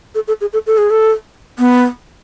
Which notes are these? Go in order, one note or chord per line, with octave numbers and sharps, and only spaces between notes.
A4
A4
G#4
A4
A4
G#4
A4
B3